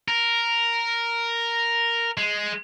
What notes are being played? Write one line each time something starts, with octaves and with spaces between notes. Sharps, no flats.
A#4
G#3